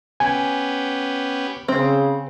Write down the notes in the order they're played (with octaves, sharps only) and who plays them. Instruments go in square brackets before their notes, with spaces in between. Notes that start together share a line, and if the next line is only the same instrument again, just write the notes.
[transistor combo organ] B3 C#4 G4 [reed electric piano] G#5
[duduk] C#3 [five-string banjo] C4